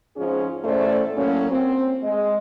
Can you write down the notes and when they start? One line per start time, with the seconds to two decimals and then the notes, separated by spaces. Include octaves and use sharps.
0.16 F2 G#2 F3 C#4 G#4
0.63 E2 A2 A3 C#4 C5 D5
1.15 A2 F#3 A#3 C#4
1.50 C4
2.03 G#3 D#5